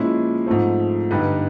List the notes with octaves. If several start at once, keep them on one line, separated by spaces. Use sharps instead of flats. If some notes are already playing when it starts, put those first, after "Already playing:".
Already playing: A#2 F3 G#3 C#4 E4
G#2 F3 A3 C4
G2 D3 G3 B3 D#4